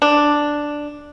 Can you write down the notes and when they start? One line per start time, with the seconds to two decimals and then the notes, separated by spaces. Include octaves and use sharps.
0.02 D4